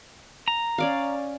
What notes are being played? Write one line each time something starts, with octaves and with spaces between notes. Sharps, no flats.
A#5
C#4 D5 F5